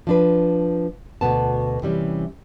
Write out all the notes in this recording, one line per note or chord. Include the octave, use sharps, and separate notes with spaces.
F3 D4 B4
D2 B2 B3 A5
C3 E3 G3 C#4